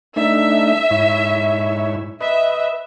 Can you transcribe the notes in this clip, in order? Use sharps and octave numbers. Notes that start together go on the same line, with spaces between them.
A3 D4 D#4 E5
G#2 E4 C#5
B4 D#5 E5